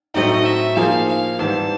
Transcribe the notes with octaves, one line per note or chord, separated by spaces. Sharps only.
A2 F#3 A3 C4 D#4 D#5
E5
F3 A#3 D#4 G#4 C5 F5
F5
G#2 E3 G3 C4 A5